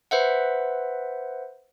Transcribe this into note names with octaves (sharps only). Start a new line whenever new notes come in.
B4 C5 E5 F#5